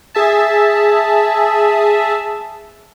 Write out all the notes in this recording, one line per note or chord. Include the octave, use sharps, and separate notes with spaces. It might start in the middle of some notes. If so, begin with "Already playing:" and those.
G#4 E5 A5